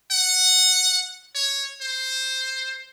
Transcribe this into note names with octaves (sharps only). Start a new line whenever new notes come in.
F#5
C#5
C5